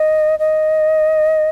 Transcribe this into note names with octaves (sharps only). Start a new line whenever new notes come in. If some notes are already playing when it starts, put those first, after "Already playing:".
Already playing: D#5
D#5